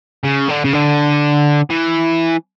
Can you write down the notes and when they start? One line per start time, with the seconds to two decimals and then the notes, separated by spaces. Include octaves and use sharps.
0.24 C#3
0.49 D3
0.64 C#3
0.73 D3
1.70 E3